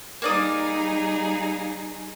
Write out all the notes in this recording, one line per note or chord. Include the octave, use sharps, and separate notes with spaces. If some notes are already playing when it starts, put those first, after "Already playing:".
G3 A#3 D#4 G#4 D5 D#6